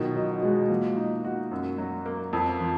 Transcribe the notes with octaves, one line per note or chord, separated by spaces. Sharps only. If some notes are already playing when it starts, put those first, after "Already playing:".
Already playing: B2 D#3 F#3 F4
F#3 D#4
F#3
G#3 F#4
F3 A#3
D#4
F#4
F#2
F#3
A#3
F2
F3